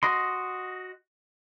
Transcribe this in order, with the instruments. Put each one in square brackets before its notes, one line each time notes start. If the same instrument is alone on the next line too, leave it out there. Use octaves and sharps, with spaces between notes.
[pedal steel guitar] F#4 D#5 C6